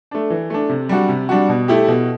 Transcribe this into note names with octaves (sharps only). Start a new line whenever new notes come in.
A3 D4
E3
A3 D4
C3
G3 D4 F#4
C3
G3 D4 F#4
B2
A3 E4 G4
B2